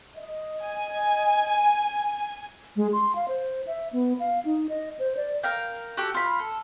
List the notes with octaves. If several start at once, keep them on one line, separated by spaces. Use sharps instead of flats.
D#5
G#5
G#3
C6
F5
C5
E5
B3
F5
D#4
D#5
C5
D5
A#4 F5 G5
F#4 G4 A4
F4 B5
A4